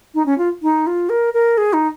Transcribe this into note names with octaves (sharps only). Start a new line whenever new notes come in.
D#4
C#4
F4
D#4
F4
A#4
A#4
G#4
D#4